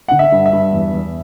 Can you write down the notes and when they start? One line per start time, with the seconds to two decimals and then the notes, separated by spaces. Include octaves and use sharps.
0.08 D3 F#5
0.19 E5
0.32 G2
0.46 E5
0.53 G2
0.73 E2
0.94 E2